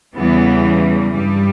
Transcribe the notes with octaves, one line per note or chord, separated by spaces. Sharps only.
E2 C#3 E3 G3 B3
G2 G3